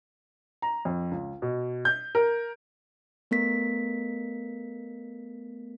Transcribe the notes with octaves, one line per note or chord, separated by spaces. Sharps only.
A#5
F2
C#2
B2
G6
A#4
A3 B3 A#4 B6